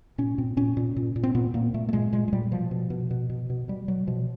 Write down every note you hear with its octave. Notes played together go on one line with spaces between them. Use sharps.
A#2 C#4
A#2 C4
A#2 C#4
A#2
A#2
A#2
C4
A#2 B3
A#2 A#3
A#2 A3
A3
A#2 G#3
A#2 G#3
G#3
A#2 G3
B2 F3
B2
B2
B2
B2
B2
B2 G3
B2 F#3
B2 F3